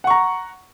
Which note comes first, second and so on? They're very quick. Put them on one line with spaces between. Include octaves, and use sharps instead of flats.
F#5 C#6 A#5